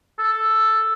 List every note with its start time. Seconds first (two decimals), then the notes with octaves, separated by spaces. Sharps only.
0.19 A4